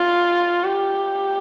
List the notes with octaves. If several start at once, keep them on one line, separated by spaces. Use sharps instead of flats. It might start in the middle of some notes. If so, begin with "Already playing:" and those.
Already playing: F4
G4